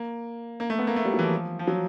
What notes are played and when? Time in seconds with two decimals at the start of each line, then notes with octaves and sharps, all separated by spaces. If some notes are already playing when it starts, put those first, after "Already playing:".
Already playing: A#3
0.60 A#3
0.70 A3
0.79 B3
0.87 A#3
0.96 A3
1.05 G3
1.14 F#3
1.19 E3
1.23 F3
1.59 F3
1.67 F#3